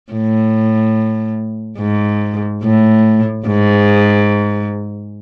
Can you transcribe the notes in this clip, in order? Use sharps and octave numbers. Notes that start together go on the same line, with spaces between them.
A2
G#2
A2
G#2